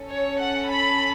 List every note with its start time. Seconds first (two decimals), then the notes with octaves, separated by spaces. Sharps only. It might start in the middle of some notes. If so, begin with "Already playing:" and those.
Already playing: C#4 A4
0.12 C#5
0.42 F#5
0.71 B5